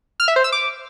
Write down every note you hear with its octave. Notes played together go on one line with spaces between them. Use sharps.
F6
E5
C5
E6
D6